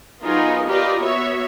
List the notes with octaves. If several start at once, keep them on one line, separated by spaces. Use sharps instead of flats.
F#3 B3 D#4 F4 G#4 A#4
F4 G4 A#4 B4 D5 D#5
B3 F#4 C#5 E5